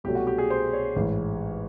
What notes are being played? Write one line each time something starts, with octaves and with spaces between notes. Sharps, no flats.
C2 B2 F#3 A3 G4
F#4
G4
G#4
C5
C#5
A1 G#2 E3